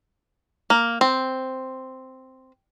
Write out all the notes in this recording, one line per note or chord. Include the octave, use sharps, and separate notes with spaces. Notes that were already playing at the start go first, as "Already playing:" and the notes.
A#3
C4